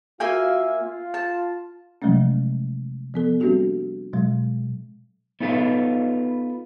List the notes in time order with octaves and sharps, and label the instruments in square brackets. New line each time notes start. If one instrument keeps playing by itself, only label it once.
[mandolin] A#3 E5 G#5 [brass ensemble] F4 F#4 F5
[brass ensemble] F4
[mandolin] A5
[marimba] C3 F3 F#3 G#3 A3 C#4
F3 B3 A4
G3 A#3 C4 D4 F#4 G4
B2 F#3 G#3
[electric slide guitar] B3 D#4 F4 A4 B4